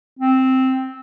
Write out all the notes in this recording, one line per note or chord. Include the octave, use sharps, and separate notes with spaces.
C4